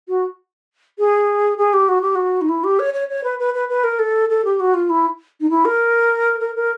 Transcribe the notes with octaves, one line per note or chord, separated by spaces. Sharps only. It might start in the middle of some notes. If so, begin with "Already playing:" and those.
F#4
G#4
G#4
G4
F#4
G4
F#4
D#4
E4
G4
C#5
C#5
C#5
B4
B4
B4
B4
A#4
A4
A4
G4
F#4
F4
E4
D#4
E4
A#4
A#4
A#4